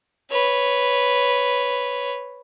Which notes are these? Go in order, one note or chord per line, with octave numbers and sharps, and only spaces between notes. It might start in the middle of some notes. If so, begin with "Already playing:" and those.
B4 C#5